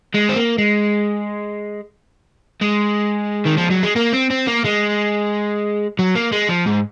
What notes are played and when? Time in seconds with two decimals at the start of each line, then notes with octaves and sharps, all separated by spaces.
0.14 G#3
0.29 C4
0.36 A#3
0.58 G#3
2.62 G#3
3.45 D#3
3.57 F3
3.70 F#3
3.83 G#3
3.96 A#3
4.13 C4
4.30 C4
4.47 A#3
4.64 G#3
5.99 F#3
6.15 A#3
6.32 G#3
6.49 F3
6.67 G#2